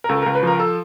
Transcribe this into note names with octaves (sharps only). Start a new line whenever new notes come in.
A#4
C#2 A4
C#2 A#4
B4
F3 A#4
A4